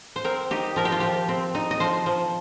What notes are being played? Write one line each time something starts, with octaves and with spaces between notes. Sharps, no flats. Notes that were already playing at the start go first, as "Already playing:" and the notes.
C5
C4 A#4
D#4 G4
F3 A#4
G4
F4
F3 G4
C4
D#4
D#5
F3 C5
F3